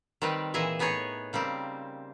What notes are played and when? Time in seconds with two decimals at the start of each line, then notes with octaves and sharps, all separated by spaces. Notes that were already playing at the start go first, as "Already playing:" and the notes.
0.22 D#3 G3 C4 D#4 B4
0.54 A#2 E3 G#4 D#5 E5
0.79 A2 B3 D#4 G#4 C#5
1.33 C#3 G3 A#3 C4